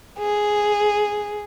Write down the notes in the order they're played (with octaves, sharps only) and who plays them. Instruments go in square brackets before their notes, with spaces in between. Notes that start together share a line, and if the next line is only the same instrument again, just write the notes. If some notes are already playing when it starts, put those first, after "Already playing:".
[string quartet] G#4